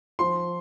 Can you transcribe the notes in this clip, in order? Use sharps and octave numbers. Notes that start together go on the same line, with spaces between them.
F3 C6